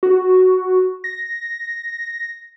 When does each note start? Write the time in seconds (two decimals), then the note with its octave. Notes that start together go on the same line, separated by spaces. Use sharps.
0.03 F#4
1.04 A#6